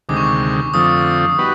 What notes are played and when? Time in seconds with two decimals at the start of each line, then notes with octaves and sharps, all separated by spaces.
0.09 D2 C3 D#3 G#3 D6
0.17 C#6
0.24 D6
0.73 F2 D3 F3 A3 C4 D#6
1.38 G3 B3 D#4 F#4 B4